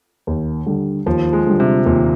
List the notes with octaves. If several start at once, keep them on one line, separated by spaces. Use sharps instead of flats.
D#2
D3 G3
D#2 F3
G#3
D3 G3
C3
D#2 A#2